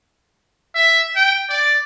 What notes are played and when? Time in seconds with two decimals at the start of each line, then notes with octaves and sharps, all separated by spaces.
0.75 E5
1.16 G5
1.50 D5